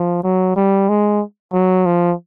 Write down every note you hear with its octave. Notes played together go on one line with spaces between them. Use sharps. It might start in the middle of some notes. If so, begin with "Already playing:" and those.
Already playing: F3
F#3
G3
G#3
F#3
F3